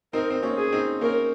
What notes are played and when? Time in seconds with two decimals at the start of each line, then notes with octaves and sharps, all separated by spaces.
0.13 C4 D#4 A#4
0.30 C4
0.42 A#3 C#4
0.57 G#4
0.72 C4 D#4
1.01 A#3 C#4 A#4